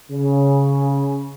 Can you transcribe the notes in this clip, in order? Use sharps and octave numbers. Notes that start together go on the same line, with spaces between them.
C#3